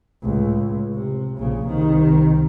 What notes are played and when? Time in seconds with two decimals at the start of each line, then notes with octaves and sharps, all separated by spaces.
0.22 C#2 A2
0.93 C3
1.38 A#1 C#3
1.66 C2 D#3